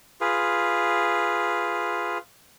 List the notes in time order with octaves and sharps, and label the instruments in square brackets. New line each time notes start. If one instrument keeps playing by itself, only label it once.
[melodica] F4 G#4 B4